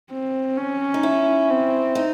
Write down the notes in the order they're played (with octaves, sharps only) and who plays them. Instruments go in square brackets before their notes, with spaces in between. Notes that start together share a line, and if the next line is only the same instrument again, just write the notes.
[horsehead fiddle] C4
C#4
[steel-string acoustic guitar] D#4
E4
[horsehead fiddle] C4
[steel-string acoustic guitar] D#4